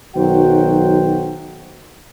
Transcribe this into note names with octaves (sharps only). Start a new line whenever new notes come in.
B1 D#3 F#3 F#4 C5 G5